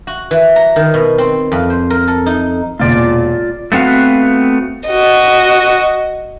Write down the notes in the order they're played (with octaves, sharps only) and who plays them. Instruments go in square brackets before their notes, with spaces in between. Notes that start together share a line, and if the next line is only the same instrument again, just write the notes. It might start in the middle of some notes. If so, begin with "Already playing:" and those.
[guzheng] F#4
E3
A#5
D#3
B2
C4
F2
C5
A#4
A4
D#4
[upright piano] E1 A#2 [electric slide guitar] F4 D5
[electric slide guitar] A3 B3 C4 F#4 F5
[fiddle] F#4 D#5